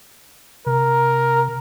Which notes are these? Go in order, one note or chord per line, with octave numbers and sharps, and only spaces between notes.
C3 A#4